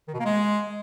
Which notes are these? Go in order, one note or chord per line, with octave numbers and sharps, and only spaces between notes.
D#3
B2
A#3
G#3